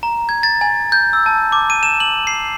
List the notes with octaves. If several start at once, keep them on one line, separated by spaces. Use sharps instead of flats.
A#5
G#6
A6
G#5
G6
E6
A5
D6
D#7
E7
F#7
C7